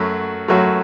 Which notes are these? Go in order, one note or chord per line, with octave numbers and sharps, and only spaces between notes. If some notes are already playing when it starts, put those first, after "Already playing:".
Already playing: F#2 F#3 A3
F#2 F#3 A3